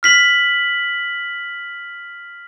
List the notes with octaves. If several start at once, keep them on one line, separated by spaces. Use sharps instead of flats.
F6 B6 F#7